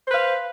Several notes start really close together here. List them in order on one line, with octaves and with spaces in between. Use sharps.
C5 B4 F5